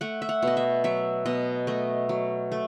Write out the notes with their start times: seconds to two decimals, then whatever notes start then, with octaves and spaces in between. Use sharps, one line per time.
0.01 A3 F#5
0.22 E5
0.29 F#5
0.43 B2 D#5
0.57 E5
0.84 F#3 E5
1.26 B2 D#5
1.67 A3 D#5
2.09 F#3
2.52 A3